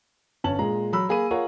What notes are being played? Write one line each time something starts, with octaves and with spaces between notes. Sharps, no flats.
G1 C#4 A5 F#7
A#2 G#3 A#5
F#3 B5 E6
A#3 G#4 B5 D#7
F4 G#4 A#4 C#5 F#5